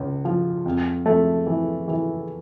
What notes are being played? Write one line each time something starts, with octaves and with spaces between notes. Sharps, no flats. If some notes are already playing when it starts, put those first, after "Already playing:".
Already playing: C#2
F3
F2
F2 A3
E3
E3